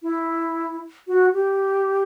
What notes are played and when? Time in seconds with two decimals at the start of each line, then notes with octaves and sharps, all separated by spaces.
0.03 E4
1.07 F#4
1.33 G4